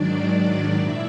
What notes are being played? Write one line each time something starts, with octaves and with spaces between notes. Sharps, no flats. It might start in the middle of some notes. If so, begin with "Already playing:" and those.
Already playing: G#2 D#3 F#3 D4 D5
D4 D5
A#2 E4 E5